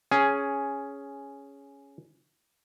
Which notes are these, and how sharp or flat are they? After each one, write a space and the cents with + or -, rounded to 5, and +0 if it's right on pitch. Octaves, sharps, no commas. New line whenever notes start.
C#4 +5 G#4 +5